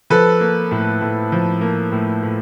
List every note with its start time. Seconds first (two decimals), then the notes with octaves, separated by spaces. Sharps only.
0.10 F3 A4 B4
0.40 A#3
0.71 A2
1.01 A2
1.32 F3
1.61 A#3
1.92 A2
2.23 A2